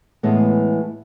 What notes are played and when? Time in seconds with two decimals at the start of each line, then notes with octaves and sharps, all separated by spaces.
0.23 A2 E3 G#3 B3